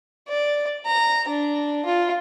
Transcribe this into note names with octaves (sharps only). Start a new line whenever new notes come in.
D5
A#5
D4
F4